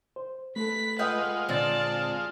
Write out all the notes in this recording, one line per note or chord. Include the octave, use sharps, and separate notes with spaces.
C5
A3 A4 B4 B6
G#3 F4 B4 D#5 F#5 G5
A#2 D3 C4 D5 A5 A6